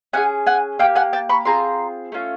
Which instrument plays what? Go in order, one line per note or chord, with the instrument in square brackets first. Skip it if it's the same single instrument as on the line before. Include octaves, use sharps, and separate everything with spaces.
[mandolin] C#4 E4 G#4 F#5 G#5
F#5 G#5
A#3 D#4 G4 F5 G5
F#5 G#5
G5 A5
B5 C#6
C4 F4 G#4 A#5 C6
A3 C#4 F4